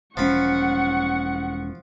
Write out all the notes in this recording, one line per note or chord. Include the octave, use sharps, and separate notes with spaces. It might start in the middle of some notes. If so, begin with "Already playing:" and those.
E1 F3 C#4 F#5 B5 C#6